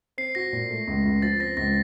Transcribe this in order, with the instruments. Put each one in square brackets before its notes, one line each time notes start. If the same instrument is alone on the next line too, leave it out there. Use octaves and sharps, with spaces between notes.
[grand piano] C4 [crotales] C7
[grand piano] F#4 [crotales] A#6
[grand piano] A#2
A3
C#2
C#2
[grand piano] F3 [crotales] A6
[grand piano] C4 [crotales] A#6
[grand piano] C#2 [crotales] A#6